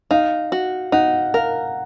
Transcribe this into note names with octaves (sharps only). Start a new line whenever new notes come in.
D#4 F5
F#4
D#4 F#5
A#4 F5